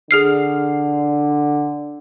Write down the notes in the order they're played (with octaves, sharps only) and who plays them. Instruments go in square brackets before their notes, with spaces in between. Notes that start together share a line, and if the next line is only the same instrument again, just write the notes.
[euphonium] D3 [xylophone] G#4 F6 C7